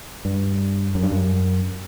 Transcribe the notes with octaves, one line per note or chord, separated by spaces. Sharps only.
G2
F#2
G2
F#2